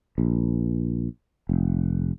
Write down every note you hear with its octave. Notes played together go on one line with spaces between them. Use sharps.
A#1
F1